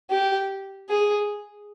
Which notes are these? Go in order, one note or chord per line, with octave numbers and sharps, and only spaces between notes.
G4
G#4